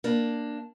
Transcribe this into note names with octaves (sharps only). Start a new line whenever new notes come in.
A#3 D4